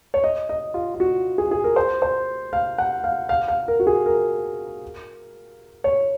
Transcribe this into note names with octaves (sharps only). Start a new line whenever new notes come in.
C#5
D#5
D#5
F4
F4
F#4
G#4
G#4
A#4
C5
C5
F5
F#5
F5
F5
F5
A#4
F#4
G#4
A#4
C#5